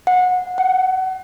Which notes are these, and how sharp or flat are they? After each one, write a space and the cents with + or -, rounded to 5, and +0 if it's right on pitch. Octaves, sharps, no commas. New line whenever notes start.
F#5 -25
F#5 +30